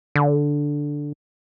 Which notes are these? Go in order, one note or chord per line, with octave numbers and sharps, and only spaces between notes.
D3